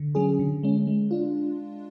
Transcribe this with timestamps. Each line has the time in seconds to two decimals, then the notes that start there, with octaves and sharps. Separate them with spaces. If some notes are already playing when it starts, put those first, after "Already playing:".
Already playing: D3
0.15 F#3 C#4 G#4
0.39 D3
0.63 G#3 C#4
0.87 G#3
1.11 D4 F4